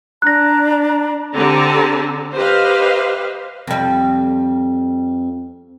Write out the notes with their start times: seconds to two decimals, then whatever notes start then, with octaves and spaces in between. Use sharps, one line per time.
0.22 D4 A#5 F#6 A#6
1.35 D3 C4 G4 A5 A#5
2.35 G4 B4 C5 D#5 F5
3.67 F2 G3